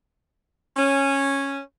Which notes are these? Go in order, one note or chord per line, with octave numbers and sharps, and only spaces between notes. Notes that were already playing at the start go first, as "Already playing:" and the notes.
C#4